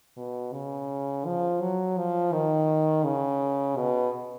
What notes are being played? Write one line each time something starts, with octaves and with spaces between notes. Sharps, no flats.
B2
C#3
F3
F#3
F3
D#3
C#3
B2